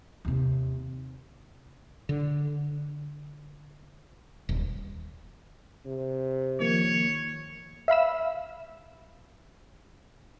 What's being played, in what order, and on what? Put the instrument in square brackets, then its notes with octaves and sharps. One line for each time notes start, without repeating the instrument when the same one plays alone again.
[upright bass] D#2 C3
[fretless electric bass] D3
D#1
[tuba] C3
[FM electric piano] D#3 F3 A#3 [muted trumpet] C#5
[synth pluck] E5 F5 B5 E6